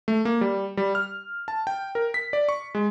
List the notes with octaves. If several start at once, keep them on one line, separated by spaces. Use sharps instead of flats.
A3
A#3
G3
G3
F6
A5
G5
A#4
B6
D5
C#6
G#3